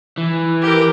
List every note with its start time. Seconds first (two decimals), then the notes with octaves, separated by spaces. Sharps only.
0.18 E3
0.62 G4 A#4